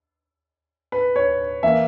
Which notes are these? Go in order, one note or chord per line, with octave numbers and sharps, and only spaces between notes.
B4
C#5
E3 A#3 E5